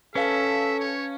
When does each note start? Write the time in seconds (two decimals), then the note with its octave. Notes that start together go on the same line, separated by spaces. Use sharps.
0.15 C#4 A4 B4 E5 F5 A5
0.80 C#5